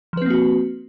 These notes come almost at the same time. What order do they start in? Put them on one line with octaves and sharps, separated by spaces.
F3 B4 C4 A#3 F#4